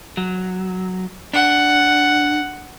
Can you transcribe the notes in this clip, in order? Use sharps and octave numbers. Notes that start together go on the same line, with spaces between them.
F#3
D4 F#5